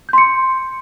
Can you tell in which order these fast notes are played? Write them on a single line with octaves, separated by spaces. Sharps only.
G6 C6 C#7